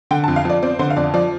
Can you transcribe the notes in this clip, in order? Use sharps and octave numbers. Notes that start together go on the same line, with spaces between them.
D3 G5
A5
F2
F5
F3 D5
C4 D5
D3 C5
F5
F2 D5
F3 D5